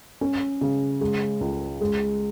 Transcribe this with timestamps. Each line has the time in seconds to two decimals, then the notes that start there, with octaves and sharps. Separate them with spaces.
0.21 C#4
0.61 C#3
1.01 G#3
1.41 C#2
1.81 G#3